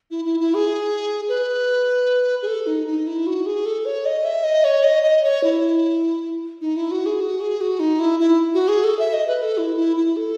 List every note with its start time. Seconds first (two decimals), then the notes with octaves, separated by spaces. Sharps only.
0.11 E4
0.25 E4
0.40 E4
0.54 G#4
1.29 B4
2.42 G#4
2.47 A4
2.66 D#4
2.87 D#4
3.07 E4
3.27 F#4
3.46 G#4
3.65 A4
3.85 C#5
4.05 D#5
4.24 E5
4.44 D#5
4.64 C#5
4.84 D#5
5.04 D#5
5.24 C#5
5.44 E4
6.61 D#4
6.76 E4
6.91 F#4
7.06 G#4
7.21 F#4
7.41 G#4
7.61 F#4
7.80 D#4
8.00 E4
8.19 E4
8.54 F#4
8.68 G#4
8.84 A4
8.99 E5
9.13 D#5
9.27 B4
9.43 A4
9.57 E4
9.77 E4
9.97 E4
10.16 A4